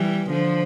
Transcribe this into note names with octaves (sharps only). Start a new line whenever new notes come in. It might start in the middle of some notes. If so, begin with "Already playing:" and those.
Already playing: E3 G3
D3 F3